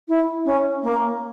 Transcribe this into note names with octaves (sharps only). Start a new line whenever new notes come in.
E4
C#4
A#3